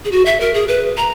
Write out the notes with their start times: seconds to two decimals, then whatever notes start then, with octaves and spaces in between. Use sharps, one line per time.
0.05 G#4
0.12 F#4
0.26 E5
0.40 A#4
0.54 G#4
0.68 B4
0.97 A#5